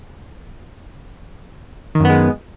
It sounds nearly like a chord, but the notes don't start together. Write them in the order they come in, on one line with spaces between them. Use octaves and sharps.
D#3 F#2 B3 G#3